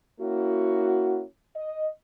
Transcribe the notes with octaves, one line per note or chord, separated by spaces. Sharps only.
A#3 C#4 E4 F#4
D#5